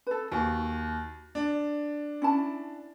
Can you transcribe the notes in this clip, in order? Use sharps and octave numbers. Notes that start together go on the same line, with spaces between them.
A4 B4
D#2 F#4 G#5
D4
C#4 E4 A5